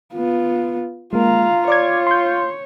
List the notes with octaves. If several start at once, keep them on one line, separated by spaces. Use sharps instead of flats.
B3 F4
G#3 A#3 F4 F5 A#5
C#5 D5 D6 G#6
C6 G6